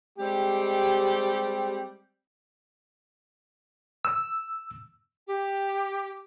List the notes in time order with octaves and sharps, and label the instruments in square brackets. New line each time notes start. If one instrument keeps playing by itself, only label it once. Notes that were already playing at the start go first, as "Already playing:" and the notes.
[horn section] G3 G#3 C4 G4
[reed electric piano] E6
[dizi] G4